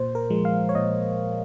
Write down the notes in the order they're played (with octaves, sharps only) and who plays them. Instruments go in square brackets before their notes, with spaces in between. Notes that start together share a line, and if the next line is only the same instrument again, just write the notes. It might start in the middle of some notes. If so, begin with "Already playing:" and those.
Already playing: [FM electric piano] A#2 C5
A#4
F3 G#3
F5
C#5
A#2 D#5